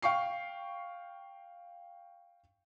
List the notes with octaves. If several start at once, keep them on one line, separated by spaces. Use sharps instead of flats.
F5 G5 C#6 C7